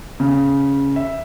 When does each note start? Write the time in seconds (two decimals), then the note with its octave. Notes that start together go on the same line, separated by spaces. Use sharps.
0.20 C#3
0.96 E5